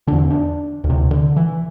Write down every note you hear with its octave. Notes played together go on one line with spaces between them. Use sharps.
E2 D3 D4
D4
D2
C3
D3
E3